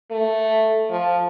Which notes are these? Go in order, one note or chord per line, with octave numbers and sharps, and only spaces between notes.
A3
F3